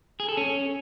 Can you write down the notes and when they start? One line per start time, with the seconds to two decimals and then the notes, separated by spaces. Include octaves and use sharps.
0.20 G#4
0.28 A4
0.37 C#4